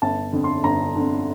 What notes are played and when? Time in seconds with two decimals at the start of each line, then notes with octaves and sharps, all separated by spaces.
0.02 G1 A5
0.32 F2 D3
0.44 C6
0.64 G1 A#5
0.96 F2 D3